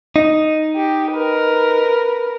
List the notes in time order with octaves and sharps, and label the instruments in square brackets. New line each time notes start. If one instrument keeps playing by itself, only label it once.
[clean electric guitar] D#4
[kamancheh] G4
A#4 B4